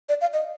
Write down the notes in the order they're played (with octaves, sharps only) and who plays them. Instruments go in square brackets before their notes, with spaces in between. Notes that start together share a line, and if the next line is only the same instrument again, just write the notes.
[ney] D5
F5
D#5